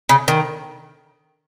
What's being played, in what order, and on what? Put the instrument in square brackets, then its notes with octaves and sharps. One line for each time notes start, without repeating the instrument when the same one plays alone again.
[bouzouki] C#3
D#3